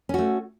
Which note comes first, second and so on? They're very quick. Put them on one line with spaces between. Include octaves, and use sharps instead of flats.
C#4 F#4 A3